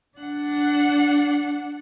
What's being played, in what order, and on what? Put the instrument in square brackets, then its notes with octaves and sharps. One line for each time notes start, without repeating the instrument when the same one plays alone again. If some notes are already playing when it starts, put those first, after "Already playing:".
[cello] D4 F#5